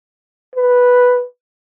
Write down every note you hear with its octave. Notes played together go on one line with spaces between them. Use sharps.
B4